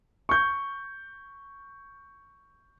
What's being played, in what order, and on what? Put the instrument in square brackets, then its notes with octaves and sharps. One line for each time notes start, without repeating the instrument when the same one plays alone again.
[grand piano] C#6 G6